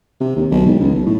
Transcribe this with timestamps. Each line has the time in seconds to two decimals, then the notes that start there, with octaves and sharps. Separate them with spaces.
0.21 C3
0.36 D#2
0.51 B1
0.66 E1
0.80 C#2
0.94 B1
1.06 A2